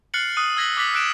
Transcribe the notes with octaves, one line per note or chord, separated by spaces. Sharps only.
F6 F#6 A6 C7 C#7 F#7
D#6 F#6 D#7
E6 G#6 A#6 B6 F#7 G7
D6 F#6 A6 B6 F#7
E6 F#6 D7 E7